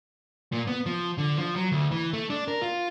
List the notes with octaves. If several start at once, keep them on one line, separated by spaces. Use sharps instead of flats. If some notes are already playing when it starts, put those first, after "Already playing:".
A#2
B3
F3
D3
F3
F#3
D2
E3
A3
D4
A#4
F4